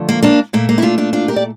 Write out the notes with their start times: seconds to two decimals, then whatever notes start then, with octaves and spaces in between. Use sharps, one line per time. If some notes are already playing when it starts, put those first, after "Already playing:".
Already playing: D3 F3 A3
0.09 A#3
0.23 A#3 D4
0.53 A#2 A3 A#3
0.69 A#3
0.78 E4
0.82 D4 F4
0.98 D4 F4
1.13 D4 F4
1.28 G4 A#4
1.36 D5